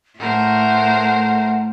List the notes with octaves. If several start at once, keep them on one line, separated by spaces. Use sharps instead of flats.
A2 A3 A#4 C5 F#5